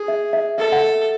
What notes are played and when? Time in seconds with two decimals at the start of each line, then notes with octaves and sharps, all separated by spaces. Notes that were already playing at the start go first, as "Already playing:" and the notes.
Already playing: G#4
0.08 E5
0.33 E5
0.58 A4 E5
0.72 F#5
0.83 E5